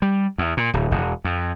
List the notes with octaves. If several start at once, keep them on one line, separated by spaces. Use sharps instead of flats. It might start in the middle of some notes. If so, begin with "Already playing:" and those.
G3
E2
A#2
D1
E1
F2